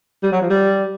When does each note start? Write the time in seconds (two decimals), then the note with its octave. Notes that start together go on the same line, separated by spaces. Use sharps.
0.23 G3
0.32 F#3
0.41 F3
0.50 G3